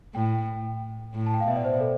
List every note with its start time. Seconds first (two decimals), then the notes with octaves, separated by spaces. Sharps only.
0.15 A2 G5
1.14 A2
1.26 A5
1.34 G5
1.40 F5
1.48 B2 E5
1.56 D5
1.64 C5
1.80 A4